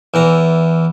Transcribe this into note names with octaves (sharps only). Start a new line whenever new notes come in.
E2 E3 A#5